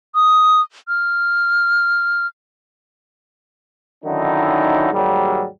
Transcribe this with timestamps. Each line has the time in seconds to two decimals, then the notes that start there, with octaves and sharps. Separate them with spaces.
0.15 D#6
0.88 F6
4.04 D3 D#3 F#3 C#4 D#4 E4
4.93 D#2 G#2 F#3 G3